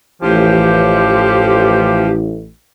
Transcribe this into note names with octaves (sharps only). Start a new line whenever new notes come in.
A1 F3 G4